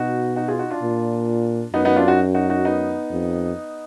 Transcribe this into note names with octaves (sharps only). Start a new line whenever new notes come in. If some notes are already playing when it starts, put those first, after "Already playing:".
Already playing: B2 D#4 F#4
D#4 F#4
F4 G#4
D#4 F#4
D4 F4
A#2
F#2 B3 D#4
B3 D#4
D4 F4
D#4 F#4
D#4 F#4
D#4 F#4
B3 D#4
F2